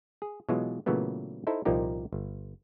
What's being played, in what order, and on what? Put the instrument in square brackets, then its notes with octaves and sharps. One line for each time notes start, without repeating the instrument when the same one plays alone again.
[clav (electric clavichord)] G#4
B2 E3 F#3 G#3 F4
A#2 C#3 E3 F#3 A3 B3
D#4 E4 A4 C5
C2 A#2 F3 A#3 D#4 G4
G1